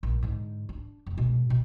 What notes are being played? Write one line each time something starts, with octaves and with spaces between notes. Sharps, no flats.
A#1 G2
G#2 D3
D4
F1
B2 G#3
B2